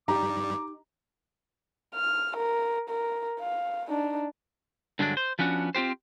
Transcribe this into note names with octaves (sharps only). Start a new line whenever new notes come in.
G2 G3 D#4 G4 A#5 D6
F6
A#4
A#4
F5
D4 D#4
G2 D3 F#3 G#3 D4
C5
F3 B3 C#4 D4 F#4
C4 F4 G4 C5